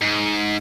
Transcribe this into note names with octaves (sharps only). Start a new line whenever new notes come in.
G#2